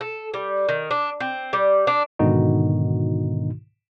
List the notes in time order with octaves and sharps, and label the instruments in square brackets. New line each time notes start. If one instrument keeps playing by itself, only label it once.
[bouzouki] A4
G3
D#3
D4
C4
G3
D4
[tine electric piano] G#2 B2 D3 D#3 D#4 F#4